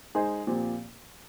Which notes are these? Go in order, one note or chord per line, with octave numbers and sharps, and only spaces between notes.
G#3 D#4 G#4 C5
A#2 F3 C4 G4